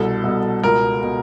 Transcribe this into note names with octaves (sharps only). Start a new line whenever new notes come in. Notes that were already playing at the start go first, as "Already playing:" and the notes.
Already playing: C2 B2 A4
C2 B2
C#2 B2 A#4
B2